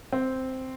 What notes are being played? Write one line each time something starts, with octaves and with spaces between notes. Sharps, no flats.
C4